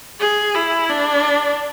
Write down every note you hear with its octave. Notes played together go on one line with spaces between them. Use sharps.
G#4
E4
D4